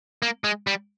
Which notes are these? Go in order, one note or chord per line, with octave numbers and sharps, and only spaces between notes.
A#3
G#3
G3